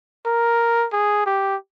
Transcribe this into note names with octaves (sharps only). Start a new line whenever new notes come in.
A#4
G#4
G4